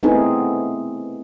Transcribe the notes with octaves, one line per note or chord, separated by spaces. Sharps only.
A3 B3 C4 D#4 E4 G#4